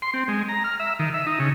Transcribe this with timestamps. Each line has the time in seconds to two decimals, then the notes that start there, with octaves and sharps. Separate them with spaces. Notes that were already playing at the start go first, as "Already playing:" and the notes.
0.02 C6
0.14 C4
0.28 G#3
0.49 A#5
0.64 F6
0.80 E5
0.99 D#3
1.14 E5
1.26 D#4
1.39 C#3